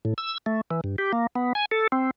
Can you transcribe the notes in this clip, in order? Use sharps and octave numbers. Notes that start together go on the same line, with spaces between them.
A2
E6
A3
E3
G2
G4
A#3
B3
G#5
A4
C4